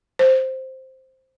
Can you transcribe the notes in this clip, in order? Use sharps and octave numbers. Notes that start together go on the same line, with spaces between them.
C5